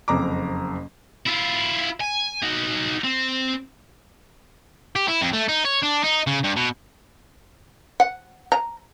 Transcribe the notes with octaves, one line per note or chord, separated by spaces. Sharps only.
F#1 F2 A#5 D6
E4 F4
G#5
D#4 F#4
C4
G4
E4
F2
A3
D#4
C#5
D4
D#4
C#3
G2
B2
F#5
A#5